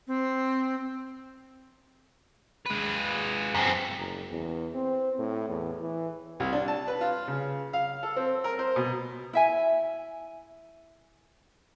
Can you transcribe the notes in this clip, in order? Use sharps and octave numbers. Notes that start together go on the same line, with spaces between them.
C4
G#3 B4
F#2 C4
F#1
E2
C4
A2
E2
E3
C2
D4
A5
B4
F4
C#3
F5
A4
C4
A#4
C5
B2
E4 E5 G#5